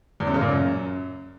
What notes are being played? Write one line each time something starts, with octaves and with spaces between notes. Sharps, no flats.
E2
F#2
C#3
A#2
F#2